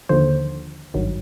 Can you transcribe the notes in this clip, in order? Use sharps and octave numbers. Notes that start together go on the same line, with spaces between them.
D#2 D3 F3 C5
G#1 G2 D#3 F#3